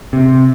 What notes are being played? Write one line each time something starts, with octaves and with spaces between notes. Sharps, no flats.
C3